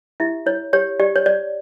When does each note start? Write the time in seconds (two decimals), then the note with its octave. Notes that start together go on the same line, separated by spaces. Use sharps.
0.20 E4 G4 E5
0.46 E4 C#5
0.73 G4 C#5
0.99 G4 D5
1.16 C#5
1.26 C#5 D5